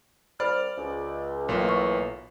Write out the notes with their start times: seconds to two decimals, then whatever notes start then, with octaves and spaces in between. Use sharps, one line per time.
0.40 C2 C5 D5 B5 F6
0.78 C#2
1.49 B1 A2 E3 A#3 F4
1.69 C#6